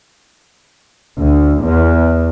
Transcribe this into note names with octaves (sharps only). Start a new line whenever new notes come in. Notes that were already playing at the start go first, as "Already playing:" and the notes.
D2
E2